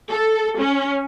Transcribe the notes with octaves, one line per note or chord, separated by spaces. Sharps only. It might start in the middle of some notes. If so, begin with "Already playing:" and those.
A4
C#4